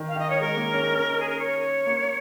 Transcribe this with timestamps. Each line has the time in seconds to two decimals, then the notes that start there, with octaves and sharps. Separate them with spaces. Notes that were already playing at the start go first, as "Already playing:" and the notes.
Already playing: D#3
0.08 F5
0.16 D#3 D#5
0.30 C#5
0.41 G#3 A#4
0.57 A#3
0.73 C#4
0.83 D#4
0.93 C#4
1.20 G#4
1.29 A#4
1.39 C#5
1.87 A#3